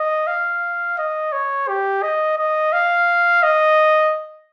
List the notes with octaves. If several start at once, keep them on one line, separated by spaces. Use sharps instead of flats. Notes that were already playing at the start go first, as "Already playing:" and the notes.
Already playing: D#5
F5
D#5
C#5
G4
D#5
D#5
F5
D#5